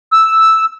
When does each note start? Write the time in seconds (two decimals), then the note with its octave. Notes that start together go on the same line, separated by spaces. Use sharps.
0.13 E6